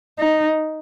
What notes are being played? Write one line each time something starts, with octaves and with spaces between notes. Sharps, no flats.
D#4